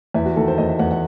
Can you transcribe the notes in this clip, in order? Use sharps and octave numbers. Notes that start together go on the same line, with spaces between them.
E2 E4
F#4
D#3 A4
C5
E2 D#5
E5
E2 F#5
F#5